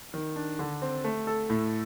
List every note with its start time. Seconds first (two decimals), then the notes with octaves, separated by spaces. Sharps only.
0.14 D#3
0.36 D4
0.59 D3
0.82 C4
1.04 A3
1.27 A4
1.50 A2